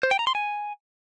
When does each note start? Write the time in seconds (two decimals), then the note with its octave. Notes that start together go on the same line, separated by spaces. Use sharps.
0.03 C5
0.11 G5
0.19 A#5
0.27 C6
0.35 G#5